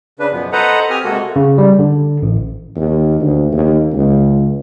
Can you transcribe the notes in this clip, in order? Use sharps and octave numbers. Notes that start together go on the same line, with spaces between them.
C#3 D4 B4
F#2 B2 F3 B3
A4 B4 C5 D#5 F#5 A#5
C4 G4 G#5 D#6 F6
C3 G#3 A#3 F#4 A4
C#3
G3
D3
A1
D#2
D2
D#2
C#2